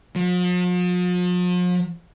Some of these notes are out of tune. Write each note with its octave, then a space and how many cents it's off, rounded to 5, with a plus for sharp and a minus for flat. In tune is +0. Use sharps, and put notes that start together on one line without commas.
F3 +45